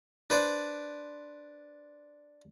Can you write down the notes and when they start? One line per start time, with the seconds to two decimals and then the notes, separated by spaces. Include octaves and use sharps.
0.30 D4 B4 C5 D5